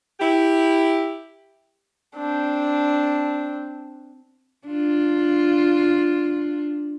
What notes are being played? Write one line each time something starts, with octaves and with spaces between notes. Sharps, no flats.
E4 G4
C4 D4
D4 F4